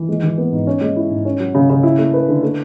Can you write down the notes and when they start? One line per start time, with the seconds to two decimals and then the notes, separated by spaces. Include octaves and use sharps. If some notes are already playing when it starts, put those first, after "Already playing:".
Already playing: E3
0.09 G#3
0.23 E3
0.38 B3
0.53 G#2
0.67 C#4
0.81 G#3
0.96 E4
1.10 G#2
1.25 C#4
1.40 F#3
1.55 C#3
1.70 C#3
1.83 E4
1.99 A3
2.14 B4
2.28 D3
2.43 A3